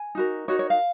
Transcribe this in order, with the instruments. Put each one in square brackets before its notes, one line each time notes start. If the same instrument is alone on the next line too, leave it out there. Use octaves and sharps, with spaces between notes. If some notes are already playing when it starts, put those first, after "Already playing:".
Already playing: [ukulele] G#5
D#4 F#4 A#4
D#4 F#4 A#4 C#5
C#5
F5